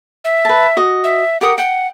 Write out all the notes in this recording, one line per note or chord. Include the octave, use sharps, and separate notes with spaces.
E5
B4 A5
F#4 D#5
E5
G4 A#4 F#5 D#6
F#5 G5